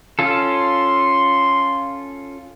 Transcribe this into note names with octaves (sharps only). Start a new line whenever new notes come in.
C#4 F4 A4 C6